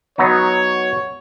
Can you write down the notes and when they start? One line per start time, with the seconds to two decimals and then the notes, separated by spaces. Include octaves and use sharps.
0.18 F#3 B3 D#4 C#5